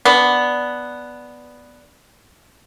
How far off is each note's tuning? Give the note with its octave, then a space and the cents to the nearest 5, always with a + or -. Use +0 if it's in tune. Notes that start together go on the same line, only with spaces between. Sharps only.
B3 +0 D4 +0